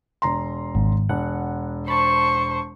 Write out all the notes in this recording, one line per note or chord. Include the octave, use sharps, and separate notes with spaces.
E1 A#5 C6
G#1
E1 F#5
C5 A5 B5 C#6